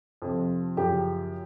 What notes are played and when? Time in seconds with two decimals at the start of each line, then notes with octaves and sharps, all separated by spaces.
0.22 F2 C3 F3
0.77 F#2 C#3 F3 G4